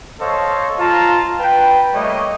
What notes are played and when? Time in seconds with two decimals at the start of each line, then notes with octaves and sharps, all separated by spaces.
0.20 A4 C5 C#5 D#5 F5 C#6
0.79 F4 A5 A#5
1.39 B4 G5
1.94 G3 A3 A#3 C#5 D#5